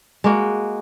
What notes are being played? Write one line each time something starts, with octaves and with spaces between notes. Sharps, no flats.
G#3 A#3 F#4